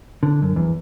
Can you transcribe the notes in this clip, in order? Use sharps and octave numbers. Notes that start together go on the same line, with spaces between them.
D3
F#2
E2